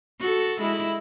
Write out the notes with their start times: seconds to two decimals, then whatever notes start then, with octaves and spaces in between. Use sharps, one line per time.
0.20 F#4 A4
0.60 G#3 E4